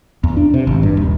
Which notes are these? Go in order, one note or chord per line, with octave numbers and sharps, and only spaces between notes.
E2
D4
C3
G#1
G2
D#1